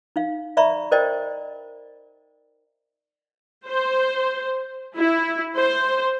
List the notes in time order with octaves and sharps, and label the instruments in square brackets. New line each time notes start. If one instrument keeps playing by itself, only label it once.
[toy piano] D#4 F5
D5 E5 A#5 B5 C#6
A#4 C5 D5 D#5 G5
[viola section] C5
E4
C5